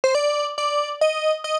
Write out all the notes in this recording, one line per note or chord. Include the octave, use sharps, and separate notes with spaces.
C5
D5
D5
D#5
D#5